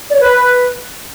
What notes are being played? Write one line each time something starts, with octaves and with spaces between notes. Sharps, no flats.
D5
C#5
B4